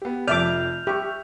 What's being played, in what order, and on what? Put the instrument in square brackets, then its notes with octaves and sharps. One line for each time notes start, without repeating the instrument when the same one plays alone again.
[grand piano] B3 G4
[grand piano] F1 F2 [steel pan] D5 E5 D6 [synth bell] F6 G6 F7
[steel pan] G4 [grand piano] E5 C#6